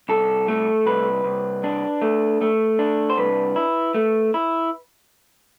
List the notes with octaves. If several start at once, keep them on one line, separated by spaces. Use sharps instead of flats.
C2 A4
A3
C2 B4
C2
D4
A3
A3
D4
C5
C2 B4
E4
A3
E4